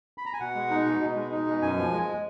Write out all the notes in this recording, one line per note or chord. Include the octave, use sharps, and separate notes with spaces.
B5
A#5
G#5
B2 F#5
G#3
D#4
B2
B2
G#3
D#4
B2
F#2 G#5
F3
G#3